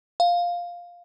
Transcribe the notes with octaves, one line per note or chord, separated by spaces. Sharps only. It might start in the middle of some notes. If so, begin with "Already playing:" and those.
F5